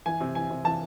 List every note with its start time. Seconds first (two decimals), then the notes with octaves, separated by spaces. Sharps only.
0.06 E3 G#5
0.21 C3
0.35 E3 G#5
0.50 C3
0.65 E3 A5